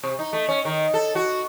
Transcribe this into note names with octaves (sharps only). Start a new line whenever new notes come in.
C3
D#4
A3
C#4
D#3
A4
F#4